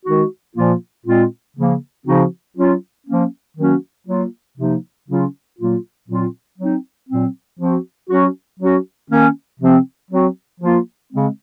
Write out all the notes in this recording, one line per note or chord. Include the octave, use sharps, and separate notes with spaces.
D#3 G#3 D#4 F#4
A#2 F3 A#3 F4
A#2 G#3 C4 F4
C#3 F3 A#3
C#3 F3 C4 D#4 F#4
F#3 C#4 F4
F3 A#3 C#4
D#3 F#3 A#3 C#4 F#4
F#3 A#3 F4
C3 F3 A#3 D#4
C#3 F#3 C#4 F4
A#2 F#3 A#3 F4
A#2 F#3 C4 F4
F#3 C4 D#4
A#2 F#3 C4
F3 C4 F#4
F#3 C#4 F#4
F#3 C#4 F#4
D#3 A#3 C#4
C3 F3 C4
F#3 C4 F#4
F3 A#3 F4
C#3 G#3 C4